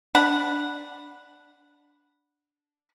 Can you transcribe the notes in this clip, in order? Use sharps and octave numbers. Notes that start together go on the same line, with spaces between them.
D4 F#5 B5